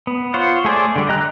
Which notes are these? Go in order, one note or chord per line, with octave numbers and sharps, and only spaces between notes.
B3
F4 C5 C#5 F#5
A3 G#4 C5 D5
D3 G3
D#5 A#5 F#6